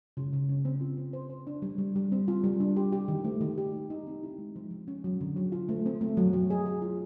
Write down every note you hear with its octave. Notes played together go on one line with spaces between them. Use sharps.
C#3
C#3
C#4
C4
F4
C4
C5
C5
D4
G3
G3
G3
C4
F4
G3
D4
G4
G4
D#3
A3
D#3
G4
D#4
D#4
C4
E4
G#3
F3
F3
C#4
F#3
D3
F#3
F4
A3
C4
A3
F#3
F#3
G#4
G#4
F4